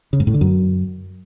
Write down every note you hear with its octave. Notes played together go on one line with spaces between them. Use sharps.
C#3
G#2
A2
D3
F#2